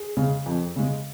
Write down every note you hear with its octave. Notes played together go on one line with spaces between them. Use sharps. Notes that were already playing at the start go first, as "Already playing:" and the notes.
Already playing: G#4
C#3 G#3
F2
C#3 G#3